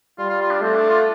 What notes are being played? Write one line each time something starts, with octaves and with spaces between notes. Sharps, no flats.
G3 F4
F4
F4
D4
A3 C4
D4
F4